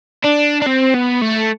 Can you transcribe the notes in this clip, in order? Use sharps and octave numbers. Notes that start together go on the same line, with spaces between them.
D4
D4
C4
B3
A3